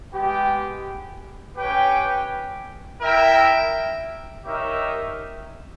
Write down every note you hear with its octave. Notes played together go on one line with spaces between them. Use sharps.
G#3 B3 G4
C#4 G4 B4 G5
E4 A#4 E5 G5
D#4 G4 A#4 C#5 E5